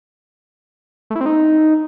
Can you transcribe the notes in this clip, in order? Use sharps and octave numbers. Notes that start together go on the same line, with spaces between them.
A3
E4
C4
D#4